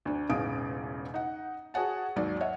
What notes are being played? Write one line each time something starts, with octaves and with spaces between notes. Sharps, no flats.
D2 D4
E1 A1 C#3 D#4 D#6 D7
D#4 F#5
F#4 G#4 C#5 F#5 A5
D#2 G#2 F#3 D5
C#5 D#5 E5 F#5